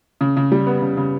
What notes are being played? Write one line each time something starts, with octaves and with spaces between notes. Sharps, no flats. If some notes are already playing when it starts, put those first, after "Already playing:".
C#3
C#3
G3
B3
C#3
C#3